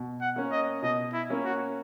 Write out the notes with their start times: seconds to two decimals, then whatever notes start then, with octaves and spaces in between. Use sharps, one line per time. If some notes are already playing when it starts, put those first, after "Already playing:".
Already playing: B2
0.21 F#5
0.36 A#3 C#4
0.52 D#5
0.82 B2 D#5
1.14 E4
1.30 A#3 C#4
1.45 F#4